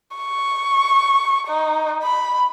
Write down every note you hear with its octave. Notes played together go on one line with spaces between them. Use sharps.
C#6
D#4
B5